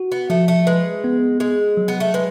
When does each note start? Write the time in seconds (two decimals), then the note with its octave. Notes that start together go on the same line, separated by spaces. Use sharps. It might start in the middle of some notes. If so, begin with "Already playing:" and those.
Already playing: F#4
0.12 B3
0.30 F3 A3
0.48 A3
0.67 G#3 B4
1.04 B3
1.40 G#3 G#4
1.77 F#3
1.88 B3
2.00 A3
2.14 G#3 B4